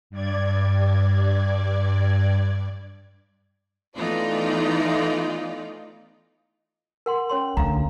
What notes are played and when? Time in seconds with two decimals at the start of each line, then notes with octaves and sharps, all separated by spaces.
0.10 G2 D5 G#6
3.96 E3 A3 B3 D#4 F4 D5
7.06 A#4 F#5 C6
7.29 C#4 C#5 C6
7.57 D2 F5 A#5